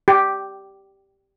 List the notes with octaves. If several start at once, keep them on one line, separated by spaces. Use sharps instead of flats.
G4